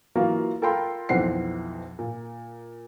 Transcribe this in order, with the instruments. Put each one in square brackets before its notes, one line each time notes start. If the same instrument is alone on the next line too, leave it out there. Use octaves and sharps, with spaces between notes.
[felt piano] E3 F#3 A#3 F4
F4 A4 A#4 G5 B5 C6
B1 F2 E3 C4 F#5 C7
A#2